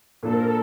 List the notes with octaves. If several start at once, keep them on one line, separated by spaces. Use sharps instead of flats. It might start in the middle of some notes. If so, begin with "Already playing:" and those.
A#2 F3 A#3 D4 A4
A#4
A4